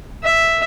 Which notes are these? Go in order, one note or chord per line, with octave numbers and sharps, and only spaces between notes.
E5